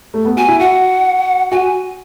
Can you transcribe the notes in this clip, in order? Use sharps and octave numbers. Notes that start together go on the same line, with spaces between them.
A3
B3
F#4 G#5
E4
F#4 F#5
F#4 G#5